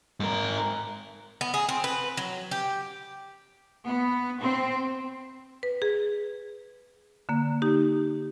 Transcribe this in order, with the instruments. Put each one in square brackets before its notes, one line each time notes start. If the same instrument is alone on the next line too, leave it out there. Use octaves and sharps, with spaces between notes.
[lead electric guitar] G#2 A#4
[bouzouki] B3
G#4
C4
B4
F#3
G4
[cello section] B3
C4
[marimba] B4
G#4
D3 A#3
D#4 G4